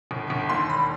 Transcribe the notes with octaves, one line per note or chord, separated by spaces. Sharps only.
G1
G1
D#2 C6
E1 B5